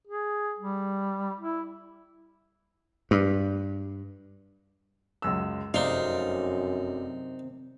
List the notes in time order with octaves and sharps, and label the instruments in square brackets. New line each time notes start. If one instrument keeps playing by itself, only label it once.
[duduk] G#4
G3
E4
[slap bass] G2
[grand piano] C#2 F#2 E6
[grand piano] F1 D5 G7 [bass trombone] F#2 [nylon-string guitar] C3 C4 F5 [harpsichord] D#4